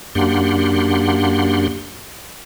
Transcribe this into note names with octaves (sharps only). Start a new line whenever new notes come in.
F#2 A#3 D4 G4 F#5 C6